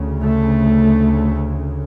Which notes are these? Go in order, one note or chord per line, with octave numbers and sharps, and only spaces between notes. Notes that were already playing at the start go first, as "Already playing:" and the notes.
Already playing: D2 C#3
A3